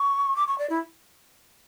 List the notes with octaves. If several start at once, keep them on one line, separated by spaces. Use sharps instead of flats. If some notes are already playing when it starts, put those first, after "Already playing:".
Already playing: C#6
D6
C#6
D5
E4